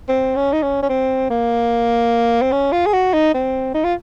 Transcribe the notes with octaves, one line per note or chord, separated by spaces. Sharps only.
C4
C#4
D#4
C#4
C#4
C4
A#3
C4
C#4
F4
G#4
F#4
D#4
C4
D#4
F4